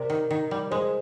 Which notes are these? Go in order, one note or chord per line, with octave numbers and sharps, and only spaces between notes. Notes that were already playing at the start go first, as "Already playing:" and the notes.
Already playing: C3 A#4 D5
D#3
D#3
G3
G#3 G#4 C5